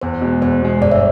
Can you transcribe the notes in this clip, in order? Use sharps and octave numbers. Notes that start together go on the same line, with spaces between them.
E2 C5
B2 G#3
E2 C5
B2 G#3
G1 D5
E5